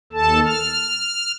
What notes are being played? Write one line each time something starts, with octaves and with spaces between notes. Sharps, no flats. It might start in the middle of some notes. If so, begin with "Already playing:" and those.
D#2 A4 A5
F6